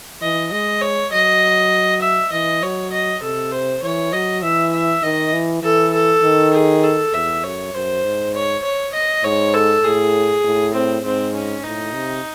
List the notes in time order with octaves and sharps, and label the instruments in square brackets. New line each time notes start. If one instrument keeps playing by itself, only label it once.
[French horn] E3 [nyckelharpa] D#5
[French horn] G#3 [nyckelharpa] D#5
[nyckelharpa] C#5
[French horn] F#3 [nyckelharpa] D#5
[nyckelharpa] E5
[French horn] E3 [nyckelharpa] D#5
[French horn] F#3 [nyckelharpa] C#5
[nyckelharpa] D#5
[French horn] C3 [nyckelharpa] A4
[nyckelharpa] C5
[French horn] E3 [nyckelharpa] C#5
[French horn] F#3 [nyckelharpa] D#5
[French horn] E3 [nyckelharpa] E5
[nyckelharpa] E5
[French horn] D#3 [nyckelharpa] D#5
[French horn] E3
[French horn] E3 [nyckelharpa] A4
[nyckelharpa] A4
[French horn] D#3
[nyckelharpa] G#4
A4
[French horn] E2 [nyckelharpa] E5
[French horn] F#2 [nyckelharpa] C#5
[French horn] F#2 [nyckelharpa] C5
[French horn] G#2
[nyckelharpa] C#5
C#5
D#5
[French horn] G#2 [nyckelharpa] C#5
[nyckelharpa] A4
[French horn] A2 [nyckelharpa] G#4
[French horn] A2
[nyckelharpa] C4
[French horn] G#2 [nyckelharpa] C4
[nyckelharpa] C#4
[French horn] A2 [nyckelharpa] D#4
[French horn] C3